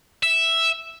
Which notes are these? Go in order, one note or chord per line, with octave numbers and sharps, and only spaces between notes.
E5